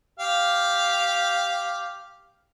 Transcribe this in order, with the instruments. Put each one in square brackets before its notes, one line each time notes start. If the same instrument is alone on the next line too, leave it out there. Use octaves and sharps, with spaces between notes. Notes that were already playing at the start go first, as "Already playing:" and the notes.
[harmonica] G4 F5